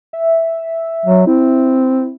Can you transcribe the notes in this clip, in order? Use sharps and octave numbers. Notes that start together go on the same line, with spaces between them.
E5
F#3
C4 E4